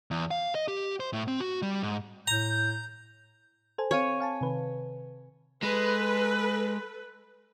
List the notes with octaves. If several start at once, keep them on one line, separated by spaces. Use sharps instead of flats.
E2
F5
D#5
G4
C5
A2
C4
F#4
G3
G#2
A2 A#5 G6
A4 C5 G#5
C4 C#5 F5 D#7
F5 G#5 A5
C3 D#3 B4
G#3 A4 B4